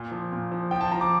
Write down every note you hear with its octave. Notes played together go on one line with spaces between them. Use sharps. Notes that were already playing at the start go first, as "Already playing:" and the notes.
Already playing: A#2
F3
A#2
F3
F3 G5
A5
F3 A#5
D6